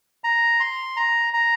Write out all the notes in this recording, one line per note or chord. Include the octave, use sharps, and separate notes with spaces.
A#5
C6
A#5
A#5